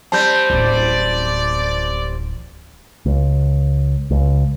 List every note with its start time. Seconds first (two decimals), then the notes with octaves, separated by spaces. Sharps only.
0.12 G3 C4 A5 G6
0.50 D1 A1 D5
3.06 C#2
4.11 C#2